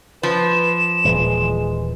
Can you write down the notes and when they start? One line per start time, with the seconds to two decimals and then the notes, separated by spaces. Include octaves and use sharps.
0.23 F3 B4 E7
1.05 D#1 A#2 E3 G#3